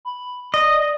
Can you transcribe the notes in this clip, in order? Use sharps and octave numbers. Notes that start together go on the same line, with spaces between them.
B5
D5 D#5